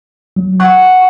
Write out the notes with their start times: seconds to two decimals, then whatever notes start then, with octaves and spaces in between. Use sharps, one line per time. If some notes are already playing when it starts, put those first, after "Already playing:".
0.36 F#3
0.60 F#5 C#6